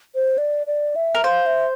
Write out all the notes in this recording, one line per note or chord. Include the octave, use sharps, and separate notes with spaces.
C5
D5
D5
E5
A#4
C5 F5
E5